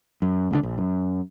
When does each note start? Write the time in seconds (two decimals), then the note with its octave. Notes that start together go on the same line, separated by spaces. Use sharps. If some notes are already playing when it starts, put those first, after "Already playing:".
0.22 F#2
0.51 C#2 A#2 D3
0.63 A#1
0.78 F#2